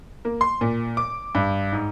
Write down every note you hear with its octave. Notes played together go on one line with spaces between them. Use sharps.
A#3
C6
A#2
D6
G2
G#2